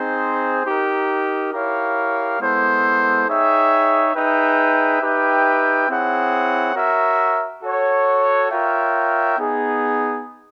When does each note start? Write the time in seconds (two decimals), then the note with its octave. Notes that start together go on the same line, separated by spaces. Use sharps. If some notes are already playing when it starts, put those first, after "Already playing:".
Already playing: C4 D#4 G#4 C5
0.65 D#4 G4 A#4
1.53 E4 G4 A#4 C#5 F5
2.40 G#3 B3 E4 A4 C5
3.28 D#4 G#4 C#5 E5 G5
4.14 D#4 G#4 B4 E5 G5
5.02 D#4 G4 B4 E5 G5
5.88 C4 E4 G#4 C#5 F#5
6.75 F#4 A#4 C#5 E5
7.62 F#4 A4 C#5 F#5
8.50 F4 A#4 C#5 E5 G5
9.37 B3 D#4 G#4